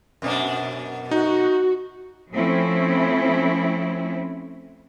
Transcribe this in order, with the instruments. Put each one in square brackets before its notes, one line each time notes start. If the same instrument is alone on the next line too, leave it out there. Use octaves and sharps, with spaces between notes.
[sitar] F#2 B2 D4
[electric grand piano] D#4 [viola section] F#4
[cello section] F3 A3 C4 C#4 E4